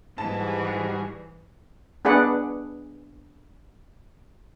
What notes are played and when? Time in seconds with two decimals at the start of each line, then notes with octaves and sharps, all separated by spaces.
0.18 G#2 E3 G3 F#4 G#4 A5
2.05 B3 D4 G#4 B4 D5 F#5